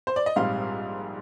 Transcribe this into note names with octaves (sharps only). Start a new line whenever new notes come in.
C5
D5
D#5
A#1 G#2 G3 C4 F5